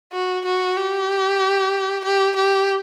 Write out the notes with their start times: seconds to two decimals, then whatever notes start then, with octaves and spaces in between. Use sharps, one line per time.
0.13 F#4
0.45 F#4
0.77 G4
2.04 G4
2.36 G4